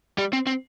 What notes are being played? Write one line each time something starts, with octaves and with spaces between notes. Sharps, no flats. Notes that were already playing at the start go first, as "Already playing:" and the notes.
G3
C4
C4